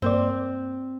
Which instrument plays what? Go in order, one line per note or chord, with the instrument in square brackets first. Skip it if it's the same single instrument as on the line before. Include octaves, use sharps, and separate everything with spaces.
[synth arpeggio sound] G2 A#3 D5 [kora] C4